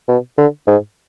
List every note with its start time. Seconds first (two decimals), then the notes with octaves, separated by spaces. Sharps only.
0.08 B2
0.38 D3
0.67 G#2